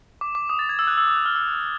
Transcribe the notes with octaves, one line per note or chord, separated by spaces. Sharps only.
D6
D6
D#6
A6
G#6
E6
F#6
E6
D#6
F#6
F6
E6